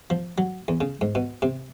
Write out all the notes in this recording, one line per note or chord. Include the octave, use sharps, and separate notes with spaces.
F3
F#3
E2
C#3
G#2
B2
C3